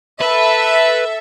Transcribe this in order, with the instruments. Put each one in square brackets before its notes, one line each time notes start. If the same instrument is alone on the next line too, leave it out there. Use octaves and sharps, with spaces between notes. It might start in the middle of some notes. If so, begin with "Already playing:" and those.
[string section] A4 E5 [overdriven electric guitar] B4